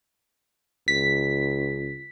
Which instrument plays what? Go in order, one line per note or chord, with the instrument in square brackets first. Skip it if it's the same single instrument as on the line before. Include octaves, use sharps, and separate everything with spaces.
[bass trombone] C#2 [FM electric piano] B6